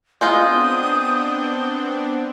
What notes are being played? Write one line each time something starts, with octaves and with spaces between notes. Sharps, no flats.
G#3 B3 C4 D4 D#4 F4 D#6 G6